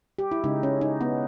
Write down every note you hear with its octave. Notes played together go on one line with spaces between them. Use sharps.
G4
E4
C#3 G#3 D#4
C#4
D#4
B3